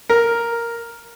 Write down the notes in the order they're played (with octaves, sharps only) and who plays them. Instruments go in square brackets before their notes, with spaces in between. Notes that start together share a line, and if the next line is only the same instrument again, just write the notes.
[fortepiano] A#4